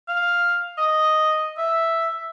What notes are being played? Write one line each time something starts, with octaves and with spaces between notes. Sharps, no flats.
F5
D#5
E5